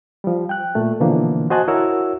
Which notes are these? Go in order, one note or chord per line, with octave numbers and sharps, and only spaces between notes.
F3 G3
G5 F#6
A#2 A3
B2 D3 E3 F3 A#3
F#4 C5 D#5 G#5 A5 F#6
E4 F#4 A#4 C#5 F#5 E6